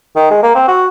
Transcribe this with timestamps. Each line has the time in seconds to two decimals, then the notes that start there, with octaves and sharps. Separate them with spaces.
0.16 D#3
0.31 G#3
0.43 A#3
0.55 C4
0.68 F#4